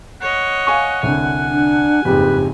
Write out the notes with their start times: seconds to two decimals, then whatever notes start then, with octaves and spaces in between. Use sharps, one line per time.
0.21 C#5 D#5 F#5
0.67 F5 G#5 C#6
1.03 C2 D3 G#5
1.50 D4
2.05 F#1 F2 G#2 G4 B4